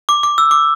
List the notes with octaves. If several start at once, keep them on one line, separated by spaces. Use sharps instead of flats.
D6
D6
E6
D6